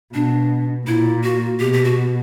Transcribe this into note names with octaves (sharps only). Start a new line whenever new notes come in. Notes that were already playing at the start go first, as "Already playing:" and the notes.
B2 D4
A#2 E4
F#4
B2 G4
G4
F#4